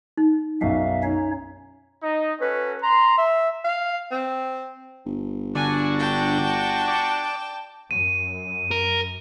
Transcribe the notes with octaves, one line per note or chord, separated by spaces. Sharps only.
D#4
B1 F#2 E5 F5
C#4 D#4 C#5
D#4 D#5
C#4 F#4 A4 B4
A#5 C6
E5
F5
C4
G1
D3 D4 F#4 G#5
G5 A5
D5
F#2 D#7
A#4